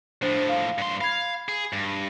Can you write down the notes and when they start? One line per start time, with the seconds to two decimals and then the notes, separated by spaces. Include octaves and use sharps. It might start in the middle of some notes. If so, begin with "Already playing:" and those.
0.22 A2 F3 D4 C5 A6
0.49 F5
0.78 G2 C6
1.01 F5 B5 G#6
1.49 G#4
1.73 G2